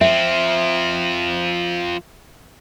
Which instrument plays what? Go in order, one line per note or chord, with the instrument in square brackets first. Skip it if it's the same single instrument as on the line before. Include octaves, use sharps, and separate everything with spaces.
[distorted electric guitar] F3 C4 [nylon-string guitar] E5